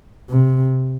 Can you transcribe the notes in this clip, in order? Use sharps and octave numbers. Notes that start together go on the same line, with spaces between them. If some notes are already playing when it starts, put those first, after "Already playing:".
C3